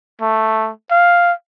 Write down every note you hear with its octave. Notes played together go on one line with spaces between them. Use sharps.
A3
F5